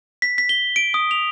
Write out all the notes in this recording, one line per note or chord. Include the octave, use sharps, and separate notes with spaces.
B6
B6
G7
D7
D#6
F7